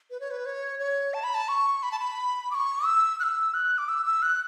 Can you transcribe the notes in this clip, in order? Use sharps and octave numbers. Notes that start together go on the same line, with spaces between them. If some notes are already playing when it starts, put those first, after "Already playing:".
B4
C#5
B4
C#5
C#5
A5
B5
A5
C#6
B5
A5
B5
D6
C#6
E6
F#6
E6
F#6
D6
E6
E6
F#6